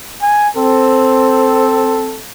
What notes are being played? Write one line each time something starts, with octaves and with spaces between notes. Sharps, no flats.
G#5
C4 A4